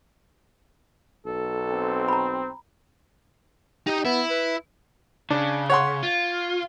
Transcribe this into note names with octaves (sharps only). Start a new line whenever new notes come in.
B1 A4
C4
A#5 B5
D#4 G4 D#5
B3 E4
B4
C#3 D4
C#5 F#5 C6
F4